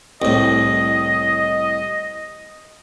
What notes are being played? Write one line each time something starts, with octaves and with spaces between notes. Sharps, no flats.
C2 A2 D#5